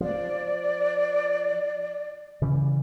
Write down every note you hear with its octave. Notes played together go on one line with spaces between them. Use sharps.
F3 D5
C#3 E3 G3